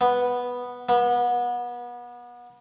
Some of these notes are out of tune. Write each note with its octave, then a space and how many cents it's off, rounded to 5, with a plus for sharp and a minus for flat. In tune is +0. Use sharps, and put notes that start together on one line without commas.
B3 -5
B3 -30